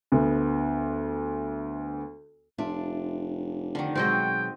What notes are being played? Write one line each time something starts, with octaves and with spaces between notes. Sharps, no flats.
D2 B3
F1 D4 F4 E5
D3 D#3
B2 F#3 G#3 C4 F#4 D#5 G5